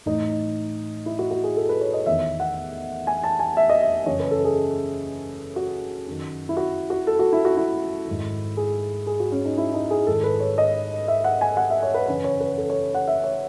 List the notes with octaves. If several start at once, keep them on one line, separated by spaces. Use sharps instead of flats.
A2 E3 D#4
E4
F#4
F#4
G#4
A4
B4
C#5
D#5
E2 D#3 E5
F#5
G#5
A5
G#5
E5
D#5
E5
F#2 C#3 E3 C#5
B4
A4
G#4
F#4
F#2 D#3
E4
F#4
F#4
A4
F#4
E4
F#4
E4
G#2 D#3
G#4
G#4
F#4
C#4
D#4
E4
D#4
G#4
G#2 D#3 A4
B4
C#5
D#5
E5
F#5
G#5
F#5
E5
C#5
B4
F#2 C#3 E3 B4
C#5
B4
A4
C#5
F#5
E5
C#5